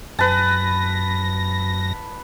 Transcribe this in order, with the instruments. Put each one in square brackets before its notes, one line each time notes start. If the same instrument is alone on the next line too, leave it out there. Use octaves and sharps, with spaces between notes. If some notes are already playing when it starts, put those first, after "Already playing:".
[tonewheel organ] F#2 A#6 [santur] B4 A5